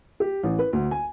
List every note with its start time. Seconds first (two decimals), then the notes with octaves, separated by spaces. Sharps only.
0.20 G4
0.43 A1
0.59 B4
0.73 D2
0.91 G#5